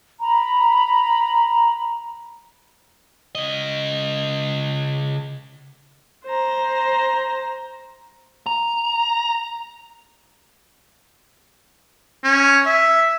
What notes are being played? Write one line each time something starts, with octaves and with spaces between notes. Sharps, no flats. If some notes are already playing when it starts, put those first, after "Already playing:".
A#5 B5
C#3 D#5
C5 A#5
A#5
C#4
E5